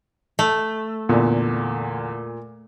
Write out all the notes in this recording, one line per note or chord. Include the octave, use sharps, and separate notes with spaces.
A3
E2 A#2 D3